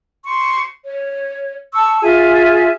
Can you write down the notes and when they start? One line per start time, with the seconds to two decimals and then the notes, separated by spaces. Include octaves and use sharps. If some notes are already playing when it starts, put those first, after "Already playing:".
0.24 C6 C#6
0.82 C#5
1.73 A5 C#6 E6
2.02 F4 G#4 E5 G#5